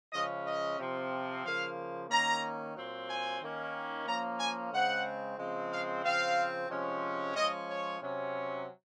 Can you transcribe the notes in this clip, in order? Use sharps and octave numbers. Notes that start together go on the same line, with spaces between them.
C#3 F3 G#3 C#4 D#5
D#5
C3 F3 C4
C#3 F3 A#3 F5
D#3 A#3 C#4 A#5
A#2 F#3 C4
G#5
D#3 A#3 C#4
F3 A#3 C#4 A#5
G#5
C#3 G#3 C4 F#5
C#3 F3 G#3 C4
F5
C#3 F3 C4 F5
C3 F3 G#3 C#4
F3 G#3 C#4 D#5
C#5
C3 F#3 C#4